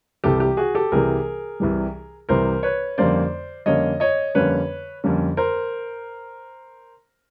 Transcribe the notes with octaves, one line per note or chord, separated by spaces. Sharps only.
C2 C3 E3 G3 G4 A4
G4
F#4 G#4
G4 A4
C2 C3 E3 G3 G#4 A#4
C2 C3 E3 G3
C2 C3 E3 G3 A#4 C5
B4 C#5
F2 D3 G3 A#3 C#4 C5 D5
F2 D3 G3 A#3 C#4 C#5 D#5
C#5 D#5
F2 D3 G3 A#3 C#4 B4 C#5
F2 D3 G3 A#3 C#4
A#4 C5